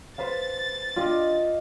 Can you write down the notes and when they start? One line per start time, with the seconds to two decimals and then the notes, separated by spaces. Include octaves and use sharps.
0.18 B4 C5 F5 A6
0.96 D4 F4 G4 D5 D#5